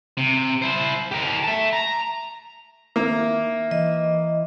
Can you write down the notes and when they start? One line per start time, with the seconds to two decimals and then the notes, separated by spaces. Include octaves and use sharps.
0.17 C3
0.62 E4 C5
1.11 G4 A#4
1.43 E5 A5
1.73 A#5
2.96 D#3 A#3 E4 A#4
3.71 E3 D#5